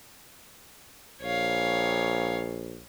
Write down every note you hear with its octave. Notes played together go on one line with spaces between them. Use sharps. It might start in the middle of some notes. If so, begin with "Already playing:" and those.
A#1 C#5 F5